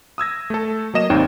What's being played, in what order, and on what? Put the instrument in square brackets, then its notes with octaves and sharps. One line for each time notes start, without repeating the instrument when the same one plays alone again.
[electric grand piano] D#6 E6 G#6 A#6
A3 A4
F#3 A#3 D#5 E7
G#1 D#2 C4 D#4 C#5 G5